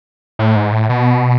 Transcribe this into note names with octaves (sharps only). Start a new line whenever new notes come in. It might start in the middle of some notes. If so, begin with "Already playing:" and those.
A2
G#2
A2
B2